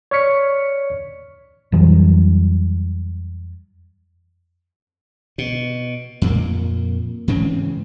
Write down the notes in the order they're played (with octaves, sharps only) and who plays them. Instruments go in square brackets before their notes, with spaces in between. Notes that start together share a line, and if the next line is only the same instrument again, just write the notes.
[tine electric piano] C#5 D5 C#6 F6 B6 C#7
[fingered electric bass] F2 E3 F#3 G3
[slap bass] B2
F2 A#2 A#3
G#2 C#3 E3 C4